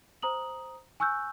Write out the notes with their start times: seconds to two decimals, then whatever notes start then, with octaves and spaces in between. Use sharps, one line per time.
0.22 C5 A#5 D#6 F#7
1.00 G#5 C#6 E6 F#6 G6